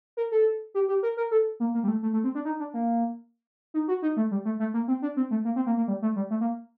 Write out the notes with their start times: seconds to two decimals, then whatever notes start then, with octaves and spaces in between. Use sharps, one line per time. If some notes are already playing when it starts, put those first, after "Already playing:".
0.17 A#4
0.32 A4
0.74 G4
0.88 G4
1.03 A#4
1.17 A#4
1.31 A4
1.60 A#3
1.74 A#3
1.83 G3
1.88 A3
2.03 A3
2.13 A3
2.24 C4
2.35 D4
2.45 D#4
2.59 D4
2.74 A#3
3.74 D#4
3.88 F#4
4.02 D#4
4.17 A3
4.31 G3
4.45 A3
4.59 A3
4.74 A#3
4.88 C4
5.02 D4
5.16 C4
5.31 A3
5.45 A#3
5.56 C4
5.66 A#3
5.77 A#3
5.88 G3
6.02 A3
6.16 G3
6.30 A3
6.41 A#3